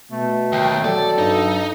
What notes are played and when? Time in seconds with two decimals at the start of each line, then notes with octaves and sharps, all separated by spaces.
0.12 B2 A3
0.52 D#2 G5
0.84 F#3 A4 D5
1.18 G2 D#4